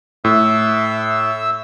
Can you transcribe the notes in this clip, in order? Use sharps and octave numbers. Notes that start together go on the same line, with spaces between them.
A2 E5 E6